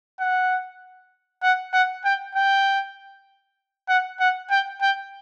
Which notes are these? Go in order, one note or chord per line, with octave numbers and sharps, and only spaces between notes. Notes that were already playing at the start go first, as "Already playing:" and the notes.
F#5
F#5
F#5
G5
G5
F#5
F#5
G5
G5